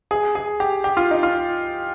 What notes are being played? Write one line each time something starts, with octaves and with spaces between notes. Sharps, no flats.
G#4
G#4
G4
G4
F4
D#4
F4